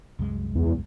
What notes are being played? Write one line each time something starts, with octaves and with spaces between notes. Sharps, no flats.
C2 F#2 G#3
E2